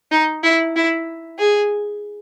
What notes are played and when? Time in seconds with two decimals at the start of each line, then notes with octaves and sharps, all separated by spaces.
0.11 D#4
0.43 E4
0.76 E4
1.39 G#4